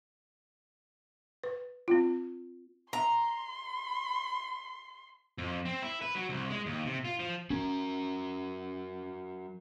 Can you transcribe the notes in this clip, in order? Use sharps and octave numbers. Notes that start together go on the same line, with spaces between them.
B4
C4 F4
A#5 C6
F2
C4
E4
B4
F#3
C2
G#3
D#2
C3
F4
F3
F#3 C#4 A#4